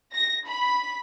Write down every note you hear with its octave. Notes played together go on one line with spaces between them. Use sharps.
A#6
B5